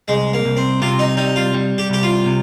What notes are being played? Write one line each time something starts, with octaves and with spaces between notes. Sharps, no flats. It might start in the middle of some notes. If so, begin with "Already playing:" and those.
C2 G#3
A#3
C2
C4
C3 F4
D#4
G3 D#4
F4
G3
G4
C2 G4
F4
C3